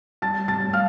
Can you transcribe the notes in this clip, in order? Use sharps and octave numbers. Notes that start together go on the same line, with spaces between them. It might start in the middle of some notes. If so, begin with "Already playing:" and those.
G3 A5 A6
A5 A6
G3
F5 F6